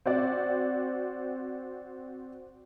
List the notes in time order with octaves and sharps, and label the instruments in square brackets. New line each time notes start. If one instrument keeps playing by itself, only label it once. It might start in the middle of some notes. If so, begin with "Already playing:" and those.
[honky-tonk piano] C4 F#4 D5